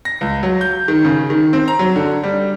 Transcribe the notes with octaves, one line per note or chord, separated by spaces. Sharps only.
A#6
C#2
F#3
G6
D#3
C#3
D#3
C4
A#5
F#3
D3
G3